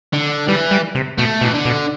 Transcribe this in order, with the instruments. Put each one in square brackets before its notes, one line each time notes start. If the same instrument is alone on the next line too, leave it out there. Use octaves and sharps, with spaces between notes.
[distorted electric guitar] D3
[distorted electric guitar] E3 [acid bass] G3
[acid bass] G3
C3
[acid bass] B2 [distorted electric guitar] A3
[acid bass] B2 [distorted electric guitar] E3
[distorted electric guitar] D3
[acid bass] B2